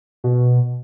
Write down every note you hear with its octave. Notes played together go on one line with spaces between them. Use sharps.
B2